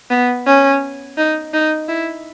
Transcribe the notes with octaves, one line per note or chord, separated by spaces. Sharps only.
B3
C#4
D#4
D#4
E4